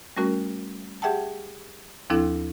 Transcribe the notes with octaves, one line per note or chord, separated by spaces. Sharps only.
G3 A3 C#4 F#4 A#4
G4 G#4 E5 F#5 G5 A5
D#2 F3 C4 D4 E4 A4